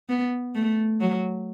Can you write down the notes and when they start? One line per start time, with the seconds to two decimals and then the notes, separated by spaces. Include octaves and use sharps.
0.09 B3
0.55 A3
1.01 F#3